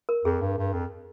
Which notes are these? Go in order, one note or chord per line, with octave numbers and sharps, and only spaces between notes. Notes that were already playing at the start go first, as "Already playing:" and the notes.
A#4
F2 G#4
G2
G2
F2